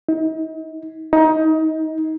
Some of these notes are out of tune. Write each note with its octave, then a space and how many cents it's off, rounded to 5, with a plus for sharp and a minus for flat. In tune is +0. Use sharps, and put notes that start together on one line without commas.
D#4 +40
D#4 +25